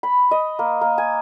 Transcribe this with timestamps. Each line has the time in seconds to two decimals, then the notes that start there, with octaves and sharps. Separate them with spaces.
0.03 B5
0.31 D#5
0.59 A#3
0.81 A#3
0.98 G#5